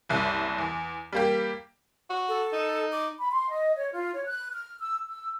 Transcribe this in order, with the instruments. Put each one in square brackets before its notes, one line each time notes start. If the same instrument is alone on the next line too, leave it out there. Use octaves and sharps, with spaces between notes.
[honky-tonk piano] F#1 C2
E2
G3 A#3 G4
[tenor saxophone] F#4
[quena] A4
[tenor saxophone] D#4
[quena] D6
[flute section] B5
C6
D#5
C#5
F4
C#5
F#6
F6
E6
E6